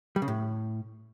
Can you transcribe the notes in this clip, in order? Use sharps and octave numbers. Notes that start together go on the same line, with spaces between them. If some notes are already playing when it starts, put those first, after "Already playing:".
G3
C#3
A2